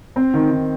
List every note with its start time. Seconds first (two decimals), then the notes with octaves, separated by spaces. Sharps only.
0.16 C4
0.34 D#3
0.50 D#3